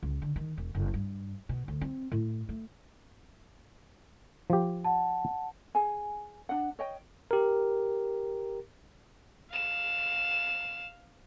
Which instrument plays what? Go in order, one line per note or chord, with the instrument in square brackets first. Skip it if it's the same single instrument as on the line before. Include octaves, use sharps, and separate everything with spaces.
[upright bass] C#2
D3
D#3
E1
F#1
G2
B2
D2
C4
A2
A3
[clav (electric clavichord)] F3 G4
[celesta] F#5 A5
[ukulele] G#4 G#5
D4 F#5
C#5 D#5 G5
[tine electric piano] G4 A#4
[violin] F5 E7